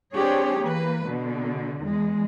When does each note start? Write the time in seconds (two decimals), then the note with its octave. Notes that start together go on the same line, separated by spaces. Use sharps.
0.14 C4 D4 G4 G#4 C#5
0.61 E3 A#3 B4
1.06 B2 D3
1.82 E2 G#3